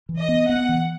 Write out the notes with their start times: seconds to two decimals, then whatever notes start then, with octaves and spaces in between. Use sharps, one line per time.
0.09 E3
0.19 D#5
0.29 B3
0.48 B3 F#5
0.69 E3